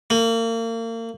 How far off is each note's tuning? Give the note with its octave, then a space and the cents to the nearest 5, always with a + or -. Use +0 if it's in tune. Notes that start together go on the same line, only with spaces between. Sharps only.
A#3 -35